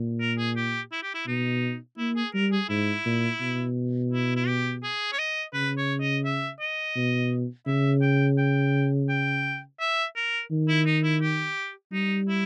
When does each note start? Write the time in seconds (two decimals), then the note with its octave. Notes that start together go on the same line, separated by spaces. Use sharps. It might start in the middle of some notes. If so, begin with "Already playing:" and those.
Already playing: A#2
0.21 A#4
0.38 G#4
0.57 G4
0.92 E4
1.03 G4
1.14 E4
1.27 B2 D#4
1.98 A#3 E4
2.16 G#4
2.34 G3 A#4
2.52 G#4
2.69 G#2 E4
3.05 A#2
3.41 B2
4.11 E4
4.36 E4
4.47 G4
4.83 G#4
5.12 C#5
5.19 D#5
5.54 C#3 B4
5.78 C#5
6.01 D#5
6.25 E5
6.60 D#5
6.96 B2
7.67 C#3 E5
8.02 G5
8.38 G5
9.09 G5
9.80 E5
10.16 A#4
10.52 D#3
10.69 E4
10.86 D#4
11.04 E4
11.22 G4
11.93 G3 D#4
12.29 E4